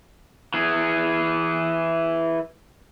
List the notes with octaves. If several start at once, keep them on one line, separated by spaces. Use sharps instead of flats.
E3 G#4